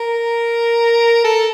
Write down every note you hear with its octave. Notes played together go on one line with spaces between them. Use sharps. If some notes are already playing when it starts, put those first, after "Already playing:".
Already playing: A#4
A4